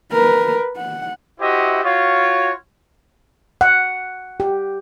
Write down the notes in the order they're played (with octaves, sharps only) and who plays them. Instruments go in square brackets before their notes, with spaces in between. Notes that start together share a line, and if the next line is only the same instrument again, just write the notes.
[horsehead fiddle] A#4 B4
F#5
[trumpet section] E4 F#4 G4 C5 D#5 E5
F4 F#4 C#5
[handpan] F#5
G4